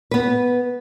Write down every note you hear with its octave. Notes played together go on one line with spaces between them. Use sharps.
B3 B4